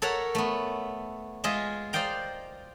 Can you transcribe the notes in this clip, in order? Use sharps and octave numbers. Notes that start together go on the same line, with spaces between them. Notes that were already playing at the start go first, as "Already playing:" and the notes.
A4 A#4 C#5 E5 F#5 A#5
A3 B3
G#3 F4 G#4 D#5 E5
C5 D5 D#5 F5 G5 A#5